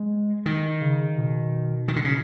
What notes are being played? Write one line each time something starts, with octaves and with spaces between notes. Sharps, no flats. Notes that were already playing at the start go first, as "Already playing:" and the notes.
Already playing: G#3
D#3
C#3
B2
D#3
D3
C#3